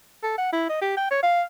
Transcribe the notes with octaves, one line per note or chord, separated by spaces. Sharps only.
A4
F#5
E4
D#5
G4
G5
C#5
F5